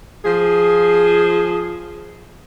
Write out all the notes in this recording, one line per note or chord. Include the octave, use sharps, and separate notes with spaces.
F3 G#4